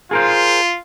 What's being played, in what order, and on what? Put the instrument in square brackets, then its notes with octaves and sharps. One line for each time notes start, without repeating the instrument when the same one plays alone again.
[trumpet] F4 [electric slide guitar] G#4 A#4 C5